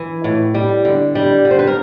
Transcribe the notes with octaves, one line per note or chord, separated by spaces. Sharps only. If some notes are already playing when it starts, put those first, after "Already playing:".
Already playing: E3
A2
G3
D3
G3
D3
C5
B4
A#4